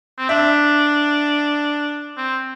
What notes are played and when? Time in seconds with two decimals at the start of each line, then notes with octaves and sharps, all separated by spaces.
0.18 C4
0.29 D4 E5
2.17 C4